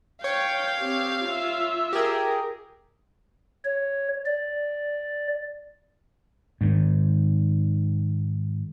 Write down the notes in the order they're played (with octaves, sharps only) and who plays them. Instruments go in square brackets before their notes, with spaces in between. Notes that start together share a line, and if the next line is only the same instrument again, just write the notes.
[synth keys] C#5 [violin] F5 [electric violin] G5
[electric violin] C4 G4
F4 E5
[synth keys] G4 G#4 [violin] A#4
[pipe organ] C#5
D5
[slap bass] G#2 D#3